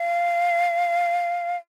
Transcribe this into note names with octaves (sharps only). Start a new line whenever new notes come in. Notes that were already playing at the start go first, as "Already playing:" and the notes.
Already playing: F5